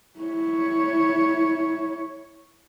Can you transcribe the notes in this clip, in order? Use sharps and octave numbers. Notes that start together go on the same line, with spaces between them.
E4 C#5